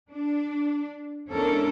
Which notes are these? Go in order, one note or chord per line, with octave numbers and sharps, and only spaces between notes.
D4
E2 G#3 C#4 D4 A4 A#4